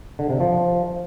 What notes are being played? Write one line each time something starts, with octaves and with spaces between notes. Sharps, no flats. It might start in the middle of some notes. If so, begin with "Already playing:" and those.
D3
C3
F3